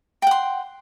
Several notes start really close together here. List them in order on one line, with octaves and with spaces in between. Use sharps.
G5 F#5 C6